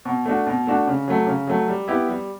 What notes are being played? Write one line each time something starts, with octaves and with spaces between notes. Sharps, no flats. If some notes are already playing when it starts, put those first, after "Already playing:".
B2
A3 D4 F#4
B2
A3 D4 F#4
C#3
F#3 A3
C#3
F#3 A3
G3
B3 E4 G4
G3